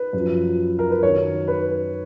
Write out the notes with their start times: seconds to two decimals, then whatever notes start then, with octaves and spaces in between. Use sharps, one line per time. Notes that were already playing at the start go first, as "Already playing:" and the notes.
Already playing: B4
0.13 F#2 F3
0.79 A#4
0.90 B4
1.03 F#2 D#3 F#3 C#5
1.48 B4